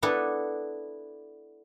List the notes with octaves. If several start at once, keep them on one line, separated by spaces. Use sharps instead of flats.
B3 D4 E4 A4 B4